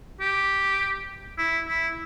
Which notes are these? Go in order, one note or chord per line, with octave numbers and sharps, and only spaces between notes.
G4
E4
E4